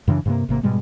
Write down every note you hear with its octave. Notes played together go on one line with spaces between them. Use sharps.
F#2 C#3 E3 D4
G2 C3 A#3
G#1 C3 A#3
G#2 B2 G3 G#3